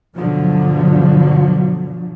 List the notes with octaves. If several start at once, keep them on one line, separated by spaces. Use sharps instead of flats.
G2 B2 D3 F3 F#3